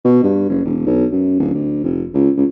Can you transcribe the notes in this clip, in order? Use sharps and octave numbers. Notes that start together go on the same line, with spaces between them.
B2
G2
F#1
E1
B1
F#2
D1
D2
F1
C#2
C#2